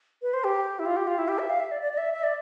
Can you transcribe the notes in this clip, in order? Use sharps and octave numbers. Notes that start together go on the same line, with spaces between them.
B4
C5
G4
E4
F4
G4
F4
E4
G4
E5
F5
E5
D5
D5
D5
E5
E5
D5